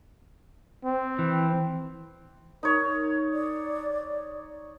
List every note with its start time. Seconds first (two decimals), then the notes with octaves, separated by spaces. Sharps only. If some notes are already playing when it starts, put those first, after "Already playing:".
0.85 C4
1.19 E3
2.63 D#4 A#4 C#5
3.34 D5